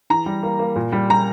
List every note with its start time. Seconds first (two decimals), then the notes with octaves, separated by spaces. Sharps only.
0.10 E3 A#5
0.26 G3
0.43 A#3
0.59 A#3
0.76 A#2
0.92 G3
1.10 G3 A#5